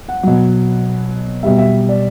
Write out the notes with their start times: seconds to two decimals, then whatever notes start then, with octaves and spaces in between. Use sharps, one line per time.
0.08 F#5
0.23 B2 F#3
1.43 B2 G3 E5
1.58 E5
1.89 D5